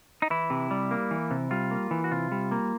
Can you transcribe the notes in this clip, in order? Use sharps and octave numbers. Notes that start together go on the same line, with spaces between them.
D#4
E3 E4
C3
G3
A#3
E3
C3
G3 F4
A#3
E3
F#4
C3 F4
G3
A#3